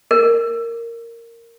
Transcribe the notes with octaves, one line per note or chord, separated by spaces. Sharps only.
A#4